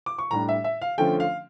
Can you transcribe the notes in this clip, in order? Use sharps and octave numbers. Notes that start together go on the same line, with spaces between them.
D6
C#6
A2 G3 D4 A#5
E5
E5
F5
D3 F3 A3 C#4 G5
F5